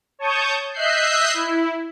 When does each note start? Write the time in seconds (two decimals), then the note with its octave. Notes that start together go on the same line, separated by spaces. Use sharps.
0.19 C#5 A5 C#6 D#6 G6
0.73 D#5 E5 E6 F#6 G6 C7
1.34 E4